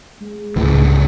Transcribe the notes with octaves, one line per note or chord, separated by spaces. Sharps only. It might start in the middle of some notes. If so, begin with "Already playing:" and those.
G#3
C#2 A2